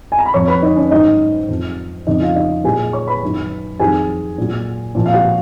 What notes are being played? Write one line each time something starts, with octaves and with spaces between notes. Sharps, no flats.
G#5
A#5
B5
F2 F3 C#5 C#6
B4 B5
D#4 D#5
C#4 C#5
G#2 D#3 F#3 D#4 D#5
F2 F3
F2 C#3 F3 D#4 D#5
F4 F5
D#4 D#5
A#2 F#3 G#4 G#5
C#5 C#6
B4 B5
F#2 D#3 F#3
F2 D#3 F#3 G#4 G#5
A#2 F#3
A#2 F3
F5
F#4 F#5